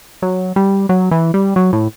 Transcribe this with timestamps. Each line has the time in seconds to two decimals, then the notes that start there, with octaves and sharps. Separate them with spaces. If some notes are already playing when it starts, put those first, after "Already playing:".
0.22 F#3
0.56 G3
0.89 F#3
1.11 E3
1.34 G3
1.56 F#3
1.73 A2